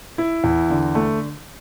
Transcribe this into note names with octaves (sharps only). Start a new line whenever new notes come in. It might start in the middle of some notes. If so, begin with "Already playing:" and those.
E4
E2
D3
A3